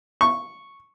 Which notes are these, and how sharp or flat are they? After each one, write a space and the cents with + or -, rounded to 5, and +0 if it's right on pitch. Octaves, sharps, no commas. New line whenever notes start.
C#6 -5